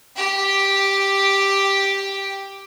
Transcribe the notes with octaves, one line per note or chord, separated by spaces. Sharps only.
G4 G5